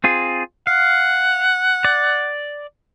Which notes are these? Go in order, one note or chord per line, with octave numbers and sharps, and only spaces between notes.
C4 F4 G#4
F5 F#5
D5